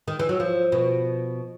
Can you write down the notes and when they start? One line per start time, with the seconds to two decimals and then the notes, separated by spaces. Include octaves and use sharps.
0.08 D#3
0.19 E3
0.29 F#3
0.40 F3
0.72 B2